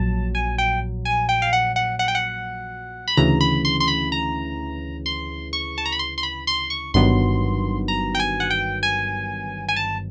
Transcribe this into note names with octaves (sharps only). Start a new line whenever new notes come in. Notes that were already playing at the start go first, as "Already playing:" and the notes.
Already playing: A#1 A#2 F#3 A5
G#5
G5
G#5
G5
F5
F#5
F#5
F#5
G5
F#5
B5
D2 C#3 E3 A#5
B5
C6
C6
B5
A#5
C6
C#6
A5
A#5
B5
C6
C6
B5
C6
C#6
G1 G2 D#3 F#3 B3 C6
A#5
G5
G#5
F#5
G5
G#5
G#5
A5